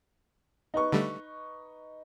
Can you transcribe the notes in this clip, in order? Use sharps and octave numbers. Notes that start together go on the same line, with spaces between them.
D#4 B4 C#6
D3 G3 A3